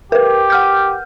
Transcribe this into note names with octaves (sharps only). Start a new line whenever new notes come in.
G4 A#4 B4
F#5 F6 G6